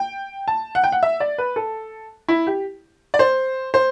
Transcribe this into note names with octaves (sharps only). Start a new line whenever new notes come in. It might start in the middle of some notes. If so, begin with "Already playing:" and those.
Already playing: G5
A5
F#5
G5
F#5
E5
D5
B4
A4
E4
G4
D5
C5
C5